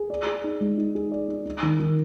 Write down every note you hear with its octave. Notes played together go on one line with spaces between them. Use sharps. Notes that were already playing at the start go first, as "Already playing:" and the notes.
Already playing: G#4
D5
G#4
D#4
G#3
D#4
G#4
D5
D#4
D#4
D#3
D#3